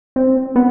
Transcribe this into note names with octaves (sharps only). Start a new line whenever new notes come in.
C4
B3